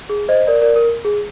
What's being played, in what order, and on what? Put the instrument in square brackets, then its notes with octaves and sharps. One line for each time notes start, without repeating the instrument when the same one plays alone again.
[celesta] G#4
C5 D#5
A#4 D5
A#4 D5
A#4
G#4